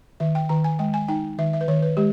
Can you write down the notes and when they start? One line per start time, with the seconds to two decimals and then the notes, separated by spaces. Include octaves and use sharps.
0.20 D#3 E5
0.35 G5
0.49 D#3 A#5
0.64 G#5
0.79 G#3 G5
0.94 G#5
1.08 D#4 G5
1.38 D#3 E5
1.53 E5
1.61 B4
1.68 D#3 C#5
1.82 B4
1.97 G#3 G4